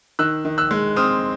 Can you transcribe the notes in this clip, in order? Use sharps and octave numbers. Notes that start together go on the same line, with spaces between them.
D#3 E6 F#6
D#3
E6 F#6
G#3
C4 D#6 F6